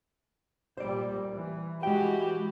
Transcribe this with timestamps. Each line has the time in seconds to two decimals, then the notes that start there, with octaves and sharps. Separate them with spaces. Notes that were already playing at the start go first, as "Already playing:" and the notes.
0.77 A#2 G3 C5 D5
1.33 E3
1.83 E3 G#3 F#4 G4 G5